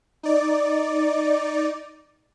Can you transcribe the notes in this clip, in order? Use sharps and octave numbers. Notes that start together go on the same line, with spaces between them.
D#4 D5